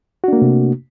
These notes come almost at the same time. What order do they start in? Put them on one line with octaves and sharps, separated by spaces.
F#4 D4 A#3 A3 C3